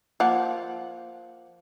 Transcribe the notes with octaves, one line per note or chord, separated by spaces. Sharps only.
F3 A#3 F#5